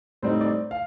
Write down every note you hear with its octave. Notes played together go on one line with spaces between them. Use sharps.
A2 G3 C4 D#4 C5
D5
F5